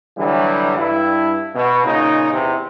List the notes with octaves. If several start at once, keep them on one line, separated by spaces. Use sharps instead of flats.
D3 E3 F#3 G3
G2 E4
B2
A#2 C#3 D#4
E2 C3